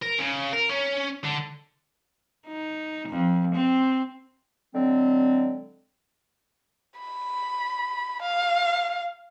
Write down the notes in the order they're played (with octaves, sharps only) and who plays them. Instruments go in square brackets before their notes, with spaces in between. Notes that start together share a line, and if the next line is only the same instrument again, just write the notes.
[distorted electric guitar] A#4
C#3
A#4
C#4
D3
[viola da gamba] D#4
F2
C4
[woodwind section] D3 F#3 G#3 C4
[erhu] B5
F5